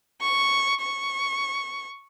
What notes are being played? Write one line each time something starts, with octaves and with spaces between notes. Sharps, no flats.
C#6
C#6